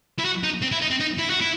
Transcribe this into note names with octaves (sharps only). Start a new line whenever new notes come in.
E4
F#4
D#4
C4
E4
D#4
C4
D#4
E4
F#4
E4